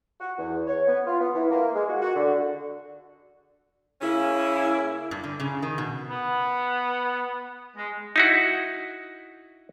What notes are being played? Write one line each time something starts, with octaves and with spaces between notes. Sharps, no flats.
F#4
E2
C#5
B3
F4
B3
E3
A#3
G#3
F#4
F#4
D3
C#3 A#3 C#4 E4
G2
D3
C#3
D#3
B2
B3
G#3
D#4 E4 F#4